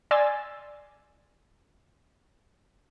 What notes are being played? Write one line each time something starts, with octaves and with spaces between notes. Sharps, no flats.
D5 G#5 C6 E6 A6